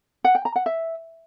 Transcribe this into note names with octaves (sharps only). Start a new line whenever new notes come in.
F#5
G5
A#5
F#5
E5